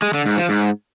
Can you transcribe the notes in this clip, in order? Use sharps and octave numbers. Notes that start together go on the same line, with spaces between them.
G#3
D3
G#2
F3
G#2